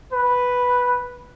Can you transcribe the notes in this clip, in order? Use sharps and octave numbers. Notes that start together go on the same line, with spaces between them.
B4